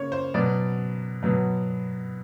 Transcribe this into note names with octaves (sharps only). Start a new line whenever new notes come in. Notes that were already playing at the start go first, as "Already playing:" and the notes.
Already playing: C#3 A#3 C#5
C5
B2 F#3 B3 D5
B2 F#3 B3